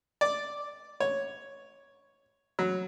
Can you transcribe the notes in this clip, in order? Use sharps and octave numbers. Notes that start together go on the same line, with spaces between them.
D5
C#5
F#3